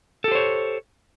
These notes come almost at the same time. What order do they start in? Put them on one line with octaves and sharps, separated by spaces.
A4 G4 C5 C#5